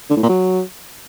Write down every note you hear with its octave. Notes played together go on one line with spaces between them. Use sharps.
D3
A2
A#2
F#3